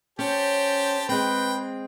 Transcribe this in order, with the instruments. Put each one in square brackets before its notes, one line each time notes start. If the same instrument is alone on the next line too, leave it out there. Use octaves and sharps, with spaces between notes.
[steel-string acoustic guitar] C#4 [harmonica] G4 C5 A5
[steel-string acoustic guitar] G#3 C4 [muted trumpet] B4 [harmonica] G5